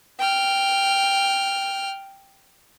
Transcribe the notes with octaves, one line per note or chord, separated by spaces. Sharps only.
G5 F6